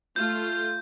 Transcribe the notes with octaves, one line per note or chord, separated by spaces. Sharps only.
A3 F4 G6